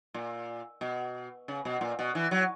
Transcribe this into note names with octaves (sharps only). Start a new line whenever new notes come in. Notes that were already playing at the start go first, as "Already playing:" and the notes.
A#2
B2
C#3
B2
A#2
B2
E3
F#3